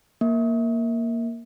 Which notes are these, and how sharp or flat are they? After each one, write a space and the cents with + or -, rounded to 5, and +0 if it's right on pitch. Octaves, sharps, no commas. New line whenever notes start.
A#3 +0